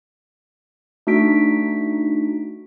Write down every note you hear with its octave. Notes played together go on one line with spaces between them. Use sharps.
A3 D4 D#4 F#4 B6 D7